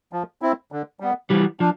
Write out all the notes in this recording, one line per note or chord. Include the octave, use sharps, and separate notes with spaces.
F3
C4 E4
D3
G3 B3
E3 F3 G3
F3 D4